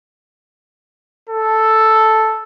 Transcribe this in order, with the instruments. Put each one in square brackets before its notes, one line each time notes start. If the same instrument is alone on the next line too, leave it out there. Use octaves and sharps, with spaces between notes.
[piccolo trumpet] A4